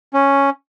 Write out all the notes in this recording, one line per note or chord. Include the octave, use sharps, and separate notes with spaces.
C#4